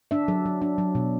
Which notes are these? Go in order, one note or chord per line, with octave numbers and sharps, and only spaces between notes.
D4 E5
F#3
F#3
D4
F#3
B2